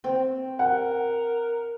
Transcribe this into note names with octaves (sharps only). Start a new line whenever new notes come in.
C4 G5
A#4 F#5